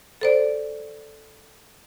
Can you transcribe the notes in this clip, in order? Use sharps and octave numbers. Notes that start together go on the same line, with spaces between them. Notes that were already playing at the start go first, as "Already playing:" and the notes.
A4 C5 D5